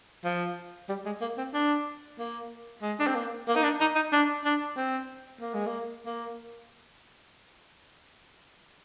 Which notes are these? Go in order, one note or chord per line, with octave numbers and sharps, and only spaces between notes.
F3
G3
G#3
A#3
C4
D4
A#3
G#3
D4
C4
A#3
A#3
D#4
D4
D#4
D#4
D4
D4
C4
A#3
G#3
A#3
A#3